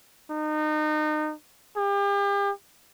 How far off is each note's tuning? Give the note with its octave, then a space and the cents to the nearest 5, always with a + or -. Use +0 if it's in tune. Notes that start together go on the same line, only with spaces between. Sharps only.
D#4 -30
G4 +40